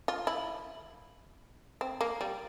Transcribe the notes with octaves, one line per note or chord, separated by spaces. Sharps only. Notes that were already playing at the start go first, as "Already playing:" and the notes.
F4
E4
C4
A#3
G3